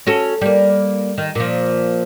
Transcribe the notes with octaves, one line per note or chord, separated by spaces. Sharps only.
C#4 F#4 A4
G3 A#3
D#3
A#2 F3